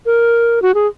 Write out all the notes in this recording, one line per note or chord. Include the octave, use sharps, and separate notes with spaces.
A#4
F#4
G#4